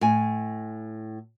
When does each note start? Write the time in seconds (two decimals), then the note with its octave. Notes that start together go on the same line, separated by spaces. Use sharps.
0.01 A2 G#5